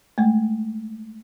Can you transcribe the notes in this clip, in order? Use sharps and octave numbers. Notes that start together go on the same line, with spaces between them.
G#3 A3